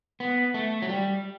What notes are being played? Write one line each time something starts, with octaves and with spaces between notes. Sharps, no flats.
B3
A3
F#3
G3